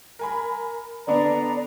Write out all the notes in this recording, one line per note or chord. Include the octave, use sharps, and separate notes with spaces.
A#4 G#5 B5
D3 B3 D4 D5 A#5